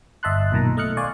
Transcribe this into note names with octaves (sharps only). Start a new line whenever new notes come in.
G1 D#5 E5 A5 C6 F#6
B1 A#2 D#3 A5 A#5
A3 D#5 F6 F#6 C#7
D5 F5 G#5 C6 C#6